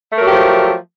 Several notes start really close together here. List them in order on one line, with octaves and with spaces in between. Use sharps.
A3 A#4 F#3 G4 F3